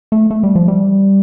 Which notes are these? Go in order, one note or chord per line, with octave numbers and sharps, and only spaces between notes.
A3
A3
G3
F3
G3